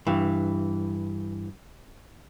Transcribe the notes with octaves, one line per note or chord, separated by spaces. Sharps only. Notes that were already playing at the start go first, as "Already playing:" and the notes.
G2 E3